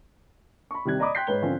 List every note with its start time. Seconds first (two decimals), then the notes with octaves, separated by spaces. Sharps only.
0.71 B5 C#6
0.85 C3 D#3 G3 F#6 G#6
0.99 D5 D#5 A#5 B5 D6 D#6
1.15 G5 C6 F#6 G6 B6 C7
1.27 G#2 B4 C#5 G7
1.42 D3 F3 C4 C#4 F4